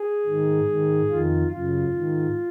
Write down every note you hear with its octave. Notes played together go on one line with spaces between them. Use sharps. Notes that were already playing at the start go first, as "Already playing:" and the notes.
Already playing: G#4
G#2 D#3
G#2 D#3
F2 D#3 F4
F#2 C#3 F4
G#2 D#3